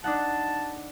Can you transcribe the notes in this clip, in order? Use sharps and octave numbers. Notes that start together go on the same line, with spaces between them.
D4 D#4 F#5 A5